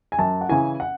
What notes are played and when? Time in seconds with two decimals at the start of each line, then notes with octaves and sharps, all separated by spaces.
0.12 G#5
0.19 F#2 A5
0.41 F#5
0.49 C#3 E3 G#5
0.80 F#5